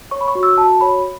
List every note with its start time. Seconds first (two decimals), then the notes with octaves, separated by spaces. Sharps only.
0.11 C#5 C#6
0.21 B5
0.28 C#6
0.35 F#4
0.43 E6
0.58 F#4 A5
0.81 C#5 B5